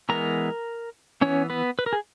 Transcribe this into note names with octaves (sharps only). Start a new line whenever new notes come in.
E3 G#3 B3 A#4 A#5
E3 B3 C#4 C#5
B3 B4
B4
A#4
G#4